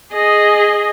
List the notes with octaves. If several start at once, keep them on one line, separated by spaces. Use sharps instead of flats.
G#4 D#5